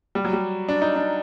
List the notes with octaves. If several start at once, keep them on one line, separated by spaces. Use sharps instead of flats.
G3
F#3
G3
D4
D#4
D4